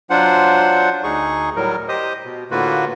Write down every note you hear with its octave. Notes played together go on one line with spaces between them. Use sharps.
F#3 D4 F4 C5 F#5
D2 D#4 G#4 C#6
A2 F#3 G3 A#4
G4 C5 D#5 D#6
B2
A2 D3 A#3 F4 F#4 B4